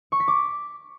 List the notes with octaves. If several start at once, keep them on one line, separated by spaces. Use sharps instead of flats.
C#6
B6
D6